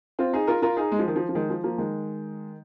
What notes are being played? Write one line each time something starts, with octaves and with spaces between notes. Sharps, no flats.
C4 F4
D#4 G#4
F4 A#4
F4 A#4
D#4 G#4
G#3
F3
D#3
F3
F3
D#3 G#3
F3
F3 A#3
D#3 G#3